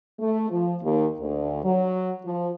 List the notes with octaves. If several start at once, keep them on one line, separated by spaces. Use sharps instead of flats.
A3
F3
D#2
D2
F#3
F3